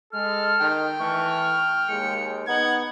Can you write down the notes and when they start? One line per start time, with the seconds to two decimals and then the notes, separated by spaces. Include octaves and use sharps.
0.12 G#3 A4 F6
0.60 D#3 G5
0.99 E3 A3 C#6 F6
1.89 D#2 G#3 C#7
2.47 B3 D#4 F#5 G#6